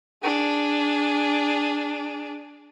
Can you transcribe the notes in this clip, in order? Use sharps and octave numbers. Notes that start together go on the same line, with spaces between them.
D4 G#4